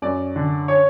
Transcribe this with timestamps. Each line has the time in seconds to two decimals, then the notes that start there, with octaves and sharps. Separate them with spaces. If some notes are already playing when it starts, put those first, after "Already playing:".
0.02 F#2 D5
0.36 D3
0.68 C#5